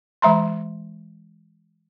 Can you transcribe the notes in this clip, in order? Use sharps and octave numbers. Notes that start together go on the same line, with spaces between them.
E3 G#3 E5 A#5 C6